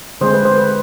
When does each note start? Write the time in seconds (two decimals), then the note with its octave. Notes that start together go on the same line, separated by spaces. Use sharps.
0.21 D3 G#3 C4 C5
0.33 B4
0.45 C5
0.58 B4